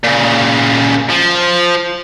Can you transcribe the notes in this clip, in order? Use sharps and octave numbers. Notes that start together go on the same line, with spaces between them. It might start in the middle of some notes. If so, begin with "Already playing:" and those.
A#2 C#3
F3